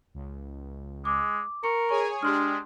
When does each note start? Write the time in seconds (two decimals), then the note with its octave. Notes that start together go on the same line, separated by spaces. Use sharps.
0.14 C#2
1.05 G#3 D6
1.64 A#4 C#6 C#7
1.89 G#4 C#5 G#5 C#6
2.22 G#3 D4 G4 C6 F6